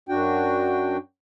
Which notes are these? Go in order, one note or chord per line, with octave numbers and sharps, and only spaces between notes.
F#2 D4 F#4 G5